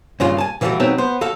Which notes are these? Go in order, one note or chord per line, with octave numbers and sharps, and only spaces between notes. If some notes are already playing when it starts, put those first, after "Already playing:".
G2 A#2 C#3 G#3 F4
G#5 A5
A#2 E3 F3 G3 A3 F#4
B2 F#3 G#3 B3 C4 D#4
B3 C5
D#2 F#4 A4 F5